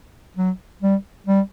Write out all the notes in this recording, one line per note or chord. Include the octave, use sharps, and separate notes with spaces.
F#3
G3
G3